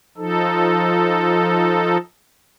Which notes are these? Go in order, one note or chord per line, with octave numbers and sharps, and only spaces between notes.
F3 D#4 A4